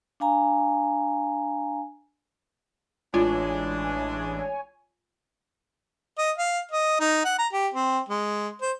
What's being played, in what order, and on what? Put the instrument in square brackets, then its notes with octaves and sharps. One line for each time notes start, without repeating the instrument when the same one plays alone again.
[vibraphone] D4 F5 G#5 A#5
[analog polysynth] A1 E3 G#3 [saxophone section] D4 [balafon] F4 [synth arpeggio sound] C#5 G#5
[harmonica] D#5
F5
D#5
D#4
F#5
A#5
G4
C4
G#3
C5